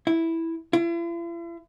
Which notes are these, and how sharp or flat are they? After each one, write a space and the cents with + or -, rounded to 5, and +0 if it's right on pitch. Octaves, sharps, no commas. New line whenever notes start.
E4 -5
E4 +45